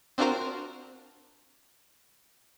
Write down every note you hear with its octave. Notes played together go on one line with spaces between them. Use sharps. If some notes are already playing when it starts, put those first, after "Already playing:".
C4 D4 F4 F#4 A#4 C5